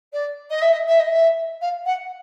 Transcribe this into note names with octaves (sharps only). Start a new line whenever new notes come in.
D5
D#5
E5
D#5
E5
D#5
E5
F5
F#5